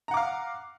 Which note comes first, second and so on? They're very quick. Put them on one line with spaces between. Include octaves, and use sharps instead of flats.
A#5 F#5 D6 F5